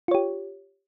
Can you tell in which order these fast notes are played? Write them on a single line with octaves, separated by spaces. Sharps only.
F4 C#5 G4